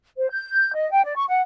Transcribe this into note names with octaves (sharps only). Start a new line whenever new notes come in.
C5
G6
D#5
G5
D5
C#6
F#5